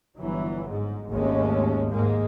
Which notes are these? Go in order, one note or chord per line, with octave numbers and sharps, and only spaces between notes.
G1 E3 F#3
G#2
G#1 D#2 G#3 A3 C#4
G#2 D#3 G#3 A#3